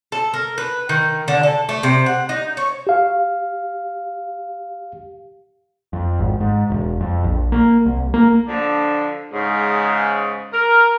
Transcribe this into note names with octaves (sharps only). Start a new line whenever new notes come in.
A4
A#4
B4
D#3
D3
A4
A3
C3
F#5
D#4
C#5
G4 F5
F2
G#1
G#2
E1
F2
A#1
A#3
C2
A#3
D3 F3 D4
G#2 C#3
A#4